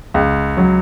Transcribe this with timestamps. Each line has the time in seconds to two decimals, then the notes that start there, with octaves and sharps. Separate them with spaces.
0.14 C#2
0.57 F#3